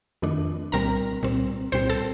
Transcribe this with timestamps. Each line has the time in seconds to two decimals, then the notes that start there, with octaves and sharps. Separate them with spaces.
0.22 F2 D#3 A3 D4
0.72 C2 A#2 G3 C4 A#4 A#5
1.23 C2 A#2 G3 C4
1.72 C2 A#2 G3 C4 C5 C6
1.89 A4 A5